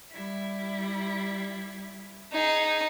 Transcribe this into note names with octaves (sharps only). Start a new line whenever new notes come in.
G3 E4
D#4 G#4